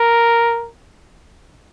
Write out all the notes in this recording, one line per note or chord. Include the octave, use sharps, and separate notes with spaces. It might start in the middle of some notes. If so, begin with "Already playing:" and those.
Already playing: A#4